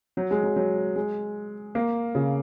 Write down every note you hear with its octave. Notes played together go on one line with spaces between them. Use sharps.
F#3
G#3
F#3
F#3
G#3
A#3
C#3